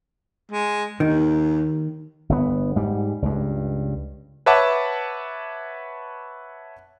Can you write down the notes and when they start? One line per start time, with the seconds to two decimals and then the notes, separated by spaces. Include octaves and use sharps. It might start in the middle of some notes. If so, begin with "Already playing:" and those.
0.51 G#3
1.00 D#2 D#3
2.29 G1 A#2 B3
2.76 G#2 G3
3.22 C#2 G2
4.46 B4 C#5 E5 F#5 A5 D6